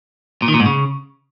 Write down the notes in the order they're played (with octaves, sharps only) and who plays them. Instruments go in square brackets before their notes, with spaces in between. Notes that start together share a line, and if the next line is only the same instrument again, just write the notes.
[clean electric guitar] A#2
D#3
A#2
G#2
C#3